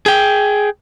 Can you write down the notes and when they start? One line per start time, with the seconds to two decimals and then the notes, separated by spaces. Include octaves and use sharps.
0.06 G#4 G5